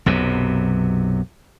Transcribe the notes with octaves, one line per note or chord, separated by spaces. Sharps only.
B1 F#2 C3